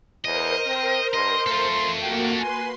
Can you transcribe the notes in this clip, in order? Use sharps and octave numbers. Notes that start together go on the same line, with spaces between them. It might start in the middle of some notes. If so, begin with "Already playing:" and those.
E2 A#4 C5 D#5
C4
G2 D#5 C6
A3 F4 A4
A#3 F#4 G5
B4 G#5 C6